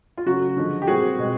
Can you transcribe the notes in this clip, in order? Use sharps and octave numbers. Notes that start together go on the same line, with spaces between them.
F4
C#3 F#3 A3 F#4
D3 F3 G#3
G4
A#2 G3 C4 F#4 G#4
B2 G#3 C4